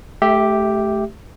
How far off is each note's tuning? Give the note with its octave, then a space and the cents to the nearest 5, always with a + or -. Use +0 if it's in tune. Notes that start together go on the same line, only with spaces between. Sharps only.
A3 -25 G4 +0 E5 +0